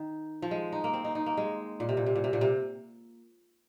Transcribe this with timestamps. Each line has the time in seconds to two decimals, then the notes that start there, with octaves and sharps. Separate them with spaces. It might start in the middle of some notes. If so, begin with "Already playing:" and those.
Already playing: D#3
0.42 F3
0.51 G#3
0.72 D#4
0.84 A#3
0.93 C4
1.04 D#4
1.15 D#4
1.26 A#3
1.37 G#3
1.80 A#2
1.89 C3
1.97 A#2
2.06 C3
2.16 A#2
2.24 C3
2.33 A#2
2.41 C3